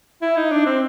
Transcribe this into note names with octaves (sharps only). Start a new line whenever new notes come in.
E4
D#4
D4
C4